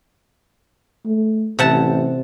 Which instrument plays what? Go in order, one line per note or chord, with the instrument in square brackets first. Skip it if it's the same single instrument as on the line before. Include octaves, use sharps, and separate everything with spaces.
[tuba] A3
[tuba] A1 [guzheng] C3 F#5 A5